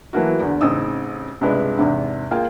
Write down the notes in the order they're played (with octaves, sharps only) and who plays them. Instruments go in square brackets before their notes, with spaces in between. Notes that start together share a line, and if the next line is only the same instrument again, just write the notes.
[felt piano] E3 F#3 A3 A#3 E4 F#4
E2 D3
A1 C#3 C4 D#4 D#6 E6
C#2 G2 C3 G#3 D4 B4
E2 G#2 C3 D4
A#3 F4 G#4 F5 G5